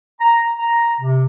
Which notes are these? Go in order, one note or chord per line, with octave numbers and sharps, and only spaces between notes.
A#5
A#5
C3